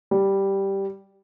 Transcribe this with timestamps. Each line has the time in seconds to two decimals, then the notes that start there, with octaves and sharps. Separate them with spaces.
0.11 G3